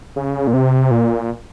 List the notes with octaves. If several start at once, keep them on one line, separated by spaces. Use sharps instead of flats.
C#3
A#2
C3
A#2